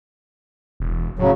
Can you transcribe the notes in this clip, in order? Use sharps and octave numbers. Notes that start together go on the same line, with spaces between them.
E1
A2 C#3 F#3